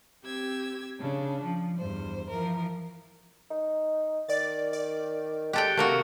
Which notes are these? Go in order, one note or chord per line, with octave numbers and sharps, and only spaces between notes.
C4 G4 E6 G#6
C#3 D4
F3
E2 G2 C5
E3 F3 A#4
D#4
D#3 D5 A6
D5
G#3 G4 A4 G5 F#6
C3 A3 A#3 F#4 A#4